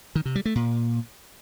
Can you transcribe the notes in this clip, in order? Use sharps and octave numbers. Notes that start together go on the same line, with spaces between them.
D#3
C3
G3
A3
A#2